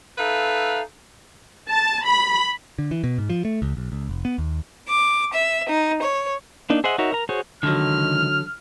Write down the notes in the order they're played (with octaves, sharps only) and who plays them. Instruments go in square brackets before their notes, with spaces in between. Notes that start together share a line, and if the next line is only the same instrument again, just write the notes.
[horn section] D#4 A4 B4 E5 F5
[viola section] A5
B5
[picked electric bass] D3
E3
B2
G#2
F3
A3
C#2
B1
C#2
F1
B3
D#2
[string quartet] D6
E5
D#4
C#5
[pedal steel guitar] A#3 D4 D#4
G#4 C5 D#5 E5 F#5
D#4 F#4 A#4 C#5 E5
A#4 A#5
F#4 G#4 C5 C#5
[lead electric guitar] C#2 D#3 [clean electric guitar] D3 F#3 [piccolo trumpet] F6